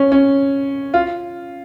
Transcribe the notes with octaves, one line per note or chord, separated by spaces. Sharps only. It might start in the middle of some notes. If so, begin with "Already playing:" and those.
Already playing: C#4
C#4
F4